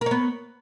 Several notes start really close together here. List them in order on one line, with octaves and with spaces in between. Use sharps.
A#4 C#5 B3